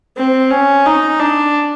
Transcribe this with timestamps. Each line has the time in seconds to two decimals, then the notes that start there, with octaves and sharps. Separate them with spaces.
0.17 C4
0.50 C#4
0.86 D#4
1.20 D4